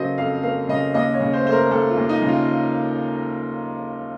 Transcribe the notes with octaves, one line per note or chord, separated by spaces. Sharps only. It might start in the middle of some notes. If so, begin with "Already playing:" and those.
Already playing: C#3 F#3 A#3 A4 C5 D#5
F2 F5
A#3 F5
C#3 D#5
D#2 D#5
C#5
C#3
C5
A3 C5
A#4
D#2 A4
F4
D#2
D#4
C#3
F4